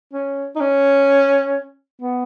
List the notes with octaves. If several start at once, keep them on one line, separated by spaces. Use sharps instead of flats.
C#4
D#4
C#4
B3